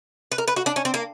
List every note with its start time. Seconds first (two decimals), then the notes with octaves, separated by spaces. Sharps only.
0.32 B4
0.38 A#4
0.47 B4
0.56 F#4
0.66 D4
0.76 C#4
0.85 C4
0.94 A#3